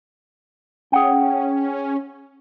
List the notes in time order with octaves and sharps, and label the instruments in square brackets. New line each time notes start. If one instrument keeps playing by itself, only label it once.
[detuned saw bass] C#4 [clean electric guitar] G#4 F#5 G5